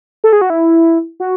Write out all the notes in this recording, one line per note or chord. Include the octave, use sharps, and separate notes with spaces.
A4
G#4
F#4
E4
F#4